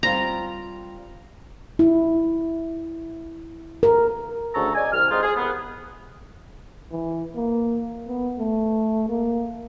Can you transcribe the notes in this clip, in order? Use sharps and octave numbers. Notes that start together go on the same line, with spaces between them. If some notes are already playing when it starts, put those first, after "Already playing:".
G3 C4 F4 A#5
E4
A#4
D2 C#3 A4 A#5 C#6
D5 D#5 G#5
C2 F6
G#3 C4 D#4 F4 F5
G#4
C2 B3
E3
A#3
B3
A3
A#3